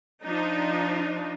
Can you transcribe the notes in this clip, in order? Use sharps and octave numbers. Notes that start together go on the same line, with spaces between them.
F3 D4 D#4